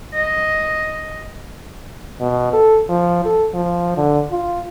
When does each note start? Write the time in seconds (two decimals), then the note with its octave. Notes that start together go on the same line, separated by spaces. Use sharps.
0.16 D#5
2.21 B2
2.53 A4
2.89 F3
3.25 A4
3.54 F3
3.97 D3
4.31 F4